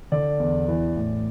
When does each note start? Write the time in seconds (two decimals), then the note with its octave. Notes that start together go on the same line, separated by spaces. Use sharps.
0.12 D3 D5
0.40 E2
0.68 E3
0.96 A2